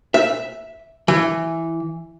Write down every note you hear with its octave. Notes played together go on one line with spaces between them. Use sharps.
E5
E3